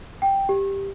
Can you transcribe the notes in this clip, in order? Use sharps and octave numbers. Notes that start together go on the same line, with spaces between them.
G5
G4